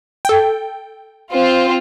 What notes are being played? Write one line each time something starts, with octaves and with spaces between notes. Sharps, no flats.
A4 G5
C4 F4